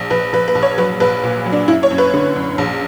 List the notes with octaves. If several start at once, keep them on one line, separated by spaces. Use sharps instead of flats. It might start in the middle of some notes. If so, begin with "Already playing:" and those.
Already playing: A#1
A#1 B4
A#1 B4
B4
A#1
C#5
F#3 B4
A#1 B4
A#2
F#3
D4
F#2 E4
C#5
F#2
B4
D3
F#2
A#1